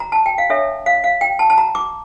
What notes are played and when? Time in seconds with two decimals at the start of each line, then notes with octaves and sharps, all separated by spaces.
0.00 A#5
0.12 A5
0.26 G5
0.38 F5
0.49 D4 A4 C#5 E5
0.86 F5
1.04 F5
1.21 G5
1.39 A5
1.50 A5
1.58 A#5
1.75 D6